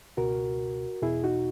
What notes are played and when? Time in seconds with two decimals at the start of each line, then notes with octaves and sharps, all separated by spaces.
0.17 C#2 B2 F#4 A#4
1.02 E2 B2 E4 G#4
1.24 D#4 F#4